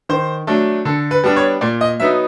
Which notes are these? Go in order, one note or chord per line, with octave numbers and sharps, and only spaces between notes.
D#3 C5
F#3 A3 D4
D3 A4
B4
G3 B3 D4
C#5
A#2 D5
D#5
F#3 B3 D#4 E5